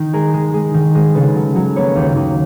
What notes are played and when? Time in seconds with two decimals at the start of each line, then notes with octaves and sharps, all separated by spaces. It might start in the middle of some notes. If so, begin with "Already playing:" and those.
Already playing: D#3 D#4
0.13 G#3 G#4 A#4
0.33 G#3
0.54 G#3
0.74 D#3
0.95 G#3
1.15 C#3 A4 B4
1.35 F#3
1.56 F#3
1.76 A#3 B4 C#5
1.96 D#2
2.16 D#2